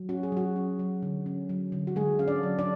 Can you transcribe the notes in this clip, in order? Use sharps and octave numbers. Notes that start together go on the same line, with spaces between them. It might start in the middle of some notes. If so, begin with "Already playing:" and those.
Already playing: F#3
C#4 F#4
G#4
F#3 F#4
C#4
F#3
D3
C#4
F#3
D3
F#4
D3 G#3 G#4
C#4 F5
D4 D5
F#3
D4 D5